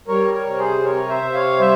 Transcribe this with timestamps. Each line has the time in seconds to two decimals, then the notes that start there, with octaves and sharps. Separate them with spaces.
0.08 G3 A#4 C#5
0.33 A#4 C#5
0.46 C3
0.59 G#4 C5
0.84 C3 A#4 C#5
1.09 C5 E5
1.22 C3
1.34 C#5 F5
1.59 G3 C5 E5